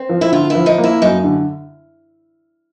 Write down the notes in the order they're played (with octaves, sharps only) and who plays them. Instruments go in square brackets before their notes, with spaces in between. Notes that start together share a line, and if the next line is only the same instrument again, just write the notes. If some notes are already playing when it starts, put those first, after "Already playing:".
Already playing: [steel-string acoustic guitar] C4
[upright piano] F3
[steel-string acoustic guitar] E4
[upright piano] D3 [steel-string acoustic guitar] F4
[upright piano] F3 [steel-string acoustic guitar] E4
[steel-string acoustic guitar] D#4
[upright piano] A#3
[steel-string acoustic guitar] E4
[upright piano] F#2 [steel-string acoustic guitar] D#4
[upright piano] D3